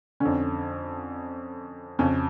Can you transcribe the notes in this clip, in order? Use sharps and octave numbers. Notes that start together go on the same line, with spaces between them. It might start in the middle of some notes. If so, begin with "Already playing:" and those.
F2 D3 C#4
F2 C#3 C#4